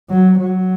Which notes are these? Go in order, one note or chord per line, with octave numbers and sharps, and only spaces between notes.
F#3
F#3